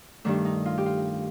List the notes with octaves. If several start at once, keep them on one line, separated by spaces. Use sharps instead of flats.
G2 D#3 A3 D4
D#4
F4
G4
F4